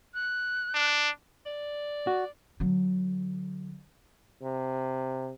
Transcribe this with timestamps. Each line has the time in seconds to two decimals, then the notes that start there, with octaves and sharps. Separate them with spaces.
0.14 F#6
0.75 D4
1.46 D5
2.07 F#4
2.60 D3 F#3
4.43 C3